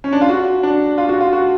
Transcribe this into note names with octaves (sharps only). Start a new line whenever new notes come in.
C#4
D4
F4
F#4
D4
F4
F#4
F4
F#4